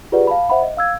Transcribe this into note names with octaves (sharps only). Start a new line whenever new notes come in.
F4 G4 G#4 B4 D5 F#5
F5 A5 B5
C5 E5 F#5 B5
D#5
F5 E6 G#6